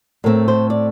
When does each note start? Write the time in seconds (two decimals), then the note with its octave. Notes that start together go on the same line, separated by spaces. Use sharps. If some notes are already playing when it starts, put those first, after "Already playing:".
0.24 A2 A3 C4 A#4
0.48 C5
0.70 D5